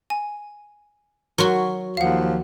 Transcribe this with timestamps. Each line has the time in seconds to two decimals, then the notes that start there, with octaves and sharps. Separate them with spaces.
0.10 G#5
1.38 F#3 F#4 A#4 C6 C#6
1.97 D#2 F3 F5 F#5